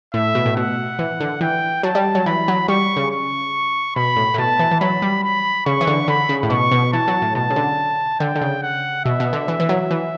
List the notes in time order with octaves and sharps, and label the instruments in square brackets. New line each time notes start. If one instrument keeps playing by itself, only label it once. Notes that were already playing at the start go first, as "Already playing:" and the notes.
[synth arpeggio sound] A2 [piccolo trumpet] E5
[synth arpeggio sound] B2
A2
[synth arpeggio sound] B2 [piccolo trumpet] F#5
[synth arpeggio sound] E3
D3
[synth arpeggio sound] E3 [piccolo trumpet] G5
[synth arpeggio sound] F#3 [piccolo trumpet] A5
[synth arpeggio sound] G3
F#3
[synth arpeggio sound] E3 [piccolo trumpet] B5
[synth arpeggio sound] F#3
[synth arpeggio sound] G3 [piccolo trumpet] C#6
[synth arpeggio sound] C#3
[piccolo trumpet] C#6
[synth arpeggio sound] B2 [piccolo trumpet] B5
[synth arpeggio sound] A2
A2
[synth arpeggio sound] B2 [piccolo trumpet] A5
[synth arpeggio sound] E3
E3
[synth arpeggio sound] F#3 [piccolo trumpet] B5
[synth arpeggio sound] G3
[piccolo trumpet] B5
[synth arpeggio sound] C#3 [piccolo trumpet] C#6
[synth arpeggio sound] E3
D3
[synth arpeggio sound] D3 [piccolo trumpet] B5
[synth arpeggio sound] C#3
A2
[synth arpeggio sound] B2 [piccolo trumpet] C#6
[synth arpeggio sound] B2
[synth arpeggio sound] E3 [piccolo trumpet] A5
[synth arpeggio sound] F#3
A2
[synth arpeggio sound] B2 [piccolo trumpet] A5
[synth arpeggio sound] C#3
D3
[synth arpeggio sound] D3 [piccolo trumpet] G5
[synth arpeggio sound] D3
C#3
[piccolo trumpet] F#5
[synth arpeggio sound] B2 [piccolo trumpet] E5
[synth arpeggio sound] B2
D3
E3
E3
F#3
E3